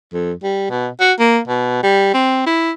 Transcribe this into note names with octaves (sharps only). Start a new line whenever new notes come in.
F2
G3
B2
F#4
A#3
B2
G3
C4
E4